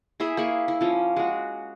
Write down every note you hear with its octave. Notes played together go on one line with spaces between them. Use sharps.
E4 G#4 E5 B5
A#3 G#4 B5 C#6
E4
F3 C#4
G#3 F#4